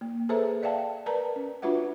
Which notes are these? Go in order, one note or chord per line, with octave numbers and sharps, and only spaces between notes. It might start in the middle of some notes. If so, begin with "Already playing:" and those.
A#3
G#4 A4 B4 C5 E5 A#5
D5 E5 F5 G5 A5
A#4 B4 D5 A5 A#5
C#4
D4 F4 F#4 B4 E5 F#5